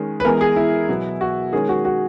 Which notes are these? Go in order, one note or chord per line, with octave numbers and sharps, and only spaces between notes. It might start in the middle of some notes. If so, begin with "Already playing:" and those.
Already playing: D#3 G#3 C#4
B4
E3 G#3 B3 A#4
G#4
E4
B2 F#3 B3
F#4
D#3 G#3 C#4 G#4
F#4
F#4